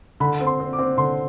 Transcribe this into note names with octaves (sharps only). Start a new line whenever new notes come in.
D3 B5
C4
C6
C4
D6
C4
D3 C6